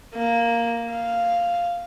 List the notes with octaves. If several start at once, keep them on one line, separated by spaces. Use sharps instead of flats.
A#3
F5